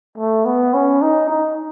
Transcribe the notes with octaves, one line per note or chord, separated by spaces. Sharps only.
A3
B3
C#4
D#4
D#4